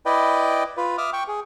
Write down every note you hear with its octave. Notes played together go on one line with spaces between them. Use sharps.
E4 B4 D5 D#5 G5
F4 B4
E5 D6 D#6 F6
G5 C#6
G#4